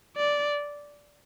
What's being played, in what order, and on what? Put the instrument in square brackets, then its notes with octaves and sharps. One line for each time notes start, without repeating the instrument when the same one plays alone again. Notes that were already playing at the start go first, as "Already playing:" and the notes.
[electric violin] D5